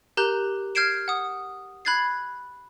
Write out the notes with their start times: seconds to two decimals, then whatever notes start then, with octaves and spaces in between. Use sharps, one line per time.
0.17 G4 A#4 A#5 F#6 G6
0.75 F6 G6 G#6 C7 D7 E7
1.08 F#5 D#6
1.85 B5 F#6 G#6 A6 C7